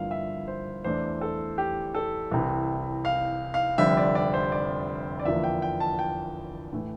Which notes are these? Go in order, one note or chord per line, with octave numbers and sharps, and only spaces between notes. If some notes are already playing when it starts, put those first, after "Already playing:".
Already playing: G1 G2 F3 A#3 E4 F5
E5
C5
E2 E3 A3 D4 C5
A4
G4
A4
C2 C3 E3
F5
F5
F1 F2 D3 G3 C4 E5
D5
D5
C5
D5
D5
E2 D3 F3 A#3 E5
G5
G5
A5
G5
A2 E3 A3